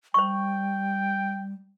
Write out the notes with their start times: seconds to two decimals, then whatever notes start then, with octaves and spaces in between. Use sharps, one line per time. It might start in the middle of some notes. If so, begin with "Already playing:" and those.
0.14 G3 C5 G5 C#6